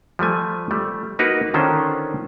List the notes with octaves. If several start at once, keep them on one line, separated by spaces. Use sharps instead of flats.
F3 G3 A3 G#5
G3 A3
A#3 D#4 F#4 A#4 B4
D3 D#3 C#4 D4 F4 C5